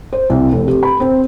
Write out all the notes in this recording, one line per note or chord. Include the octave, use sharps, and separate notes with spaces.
C5
C2
F1
G4
B5
C4